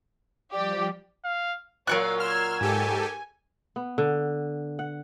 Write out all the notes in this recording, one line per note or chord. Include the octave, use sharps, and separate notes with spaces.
F3 G3 G4 D5
F5
A#2 F#3 F4 A#4 C#5 F5 C#6 F#6
C6 E6 F6 G#6
G#2 G4 A4 G#5
B3
D3
F#5